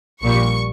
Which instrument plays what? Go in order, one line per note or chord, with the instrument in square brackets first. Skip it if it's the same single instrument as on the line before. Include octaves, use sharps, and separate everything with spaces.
[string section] A#1 A#2 G3 C#6